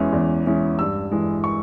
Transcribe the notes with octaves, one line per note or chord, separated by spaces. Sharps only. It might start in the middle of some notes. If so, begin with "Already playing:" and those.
Already playing: E2 E3 G#3 C#4 E4
E2
E3 G#3 C#4 E4
G2 E6
E3 G#3
C#6